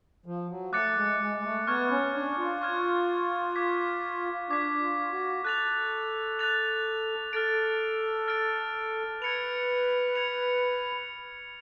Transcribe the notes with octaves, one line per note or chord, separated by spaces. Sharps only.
F3
F#3
A3 D6 F#6 A6 C#7
G#3
G#3
G#3
A3
B3 C#6 F6 G#6
C#4
D4
F4
C#6 F6 G#6
D6 G#6 B6
D4 D6 G#6 B6
F4
F#4
A4 F#6 A6 F7
F#6 A6 F7
A4 F6 A6 D7
F6 A6 D7
B4 G#6 C#7 F7
G#6 C#7 F7